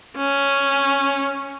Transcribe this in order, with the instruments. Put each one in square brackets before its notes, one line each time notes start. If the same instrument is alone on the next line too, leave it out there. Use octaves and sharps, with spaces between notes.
[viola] C#4